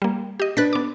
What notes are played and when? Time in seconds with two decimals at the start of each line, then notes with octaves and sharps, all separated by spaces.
0.02 G3 A#3
0.40 G4 D#5
0.57 D4 B4 F#6 A6 B6
0.73 B3 D6